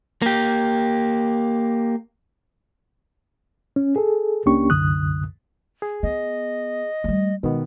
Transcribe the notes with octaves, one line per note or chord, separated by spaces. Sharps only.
A#3 G4
C#4
G#4 A4
C#2 A#3 C#4 D4 G4 C#6
C2 F#2 D3 D#6 F#6
G#4
B3 D#5
G3 A3
B2 D#3 G#3 B3